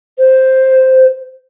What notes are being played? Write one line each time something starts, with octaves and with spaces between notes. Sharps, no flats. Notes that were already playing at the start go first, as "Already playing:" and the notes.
C5